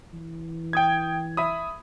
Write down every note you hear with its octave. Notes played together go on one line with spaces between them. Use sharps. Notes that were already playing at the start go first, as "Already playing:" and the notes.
E3
G5 D#6 G#6
E5 B5 D#6